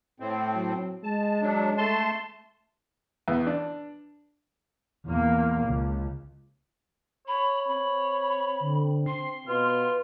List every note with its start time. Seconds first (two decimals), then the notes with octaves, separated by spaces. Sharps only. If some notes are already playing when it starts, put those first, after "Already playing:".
0.20 A2 C4
0.55 F#3
1.04 G#3 A5
1.42 F#3 D4
1.77 A3 A5 C6
3.28 E2
3.47 D4
5.06 E2 A#3
5.66 C#2
7.27 C#5 B5
7.68 C4 B5
8.60 D3
9.06 C6 C7
9.47 B2 F4 B4